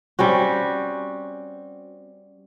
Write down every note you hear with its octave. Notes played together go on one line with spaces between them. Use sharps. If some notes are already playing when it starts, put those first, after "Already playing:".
G3 C4 C#4 F#4